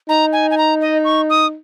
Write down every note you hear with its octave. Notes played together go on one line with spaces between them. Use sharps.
D#4 A#5
G#5
G#5
A#5
D#5
C#6
D#6